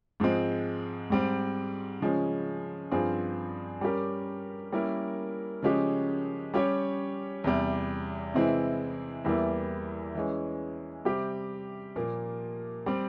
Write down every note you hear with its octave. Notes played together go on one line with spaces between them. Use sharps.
G#2 F3 G#3 C4
G#2 G3 C4
C#3 F3 G#3 C#4
G2 F3 C4 F4 G#4
G3 C#4 G4 A#4
G3 A#3 C#4 E4 A#4
C#3 F3 G#3 C#4 G4
G3 C#4 G4 C#5
E2 C3 G3
C3 E3 G#3 C4 E4
E2 E3 G3 A#3 E4
E3 G#3 C#4
C3 G3 C4 G4
A#2 F3 A#3
G3 C4